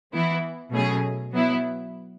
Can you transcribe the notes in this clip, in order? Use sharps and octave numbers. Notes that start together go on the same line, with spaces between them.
E3 B3 E4
B2 F#3 A3 C#4 G#4
F#3 B3 E4